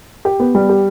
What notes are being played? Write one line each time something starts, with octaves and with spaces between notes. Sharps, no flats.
G4
B3
G3
G4